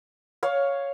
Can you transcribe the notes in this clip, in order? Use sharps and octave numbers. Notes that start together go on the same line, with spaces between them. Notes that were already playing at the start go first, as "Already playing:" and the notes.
C#5 F5